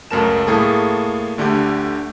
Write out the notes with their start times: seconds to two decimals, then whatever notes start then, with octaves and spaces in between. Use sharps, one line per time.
0.11 C#2 F#2 A3 A#4 A5 E7
0.47 A2 A3 A#3 G#4 A5
1.38 D2 D3 A3 G4 G6